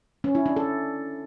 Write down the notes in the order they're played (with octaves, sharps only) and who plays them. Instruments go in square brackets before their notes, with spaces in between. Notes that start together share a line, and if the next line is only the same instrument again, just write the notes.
[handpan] C#4
E4
D4
A4